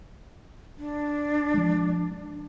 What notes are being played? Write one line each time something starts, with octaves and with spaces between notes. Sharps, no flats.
D4
F3 G#3
D4